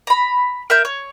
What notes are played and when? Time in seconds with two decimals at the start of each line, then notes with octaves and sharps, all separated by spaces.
0.07 A#5 B5
0.70 A#4 E5 G6
0.85 C#5